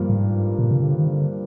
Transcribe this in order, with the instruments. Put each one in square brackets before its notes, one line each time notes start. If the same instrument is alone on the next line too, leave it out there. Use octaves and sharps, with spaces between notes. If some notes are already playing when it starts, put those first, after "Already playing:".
Already playing: [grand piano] G2 F3 A#3
[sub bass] G#2
A#2
C3
D3
D#3
D3